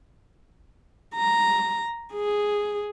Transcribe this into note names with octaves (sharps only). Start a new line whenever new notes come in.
A#5
G#4